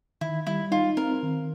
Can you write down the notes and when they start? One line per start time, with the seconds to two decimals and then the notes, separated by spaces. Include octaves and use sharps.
0.21 D#3 E4
0.47 G3 E4
0.71 D#4 F4
0.97 C4 A#4
1.23 D#3